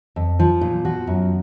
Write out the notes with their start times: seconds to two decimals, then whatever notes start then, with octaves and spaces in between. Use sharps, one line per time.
0.16 F2
0.39 F3
0.61 A#2
0.85 F3 F#4
1.07 F#2